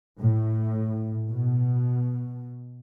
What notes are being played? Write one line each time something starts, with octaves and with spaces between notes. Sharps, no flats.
A2
B2